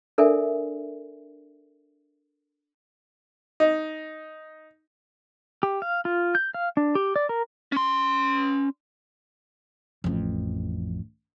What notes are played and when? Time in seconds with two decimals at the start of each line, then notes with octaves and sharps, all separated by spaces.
0.18 D4 A4 A#4 D5 E5 G#5
3.60 D#4
5.63 G4
5.82 F5
6.05 F4
6.35 G6
6.54 F5
6.77 D4
6.95 G4
7.16 D5
7.29 A#4
7.72 C#4 C6
10.04 A1 F2